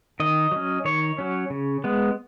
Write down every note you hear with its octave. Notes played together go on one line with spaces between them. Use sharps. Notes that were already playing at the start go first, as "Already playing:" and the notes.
D#3 D#5
F#3 C#4
D#3 C#5
F#3 C#4
C#3
G#3 B3